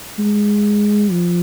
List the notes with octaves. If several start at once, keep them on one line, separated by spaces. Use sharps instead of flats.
G#3
F3